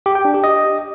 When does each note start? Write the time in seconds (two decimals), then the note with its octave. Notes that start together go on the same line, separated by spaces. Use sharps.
0.06 G4
0.15 G5
0.25 D4
0.34 G4
0.44 D#5